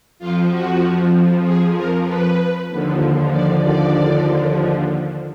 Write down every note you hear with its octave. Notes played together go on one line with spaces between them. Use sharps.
F2 F3 F4
F#4
G#4
A#4
B4
D#2 D3 F3
D5
D5